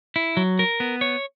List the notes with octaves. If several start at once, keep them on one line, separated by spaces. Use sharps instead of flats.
E4
F#3
A#4
B3
C#5